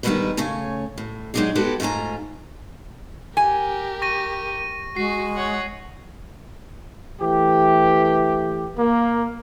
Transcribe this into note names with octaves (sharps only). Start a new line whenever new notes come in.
D3 D#3 G3 G#3 B3 B4
C#3 A3 C#5 G#5
A2
F#3 G#3 D4 D#4 G4 G#4
G#3 B3 F#4 G4 A4 B4
G#2 A3 F4 G#5 A#5
G4 A#4 G#5
C#6 A#6 D#7
G#3 F#4 C7
C#5 F#5
E3 A3 G4
A#3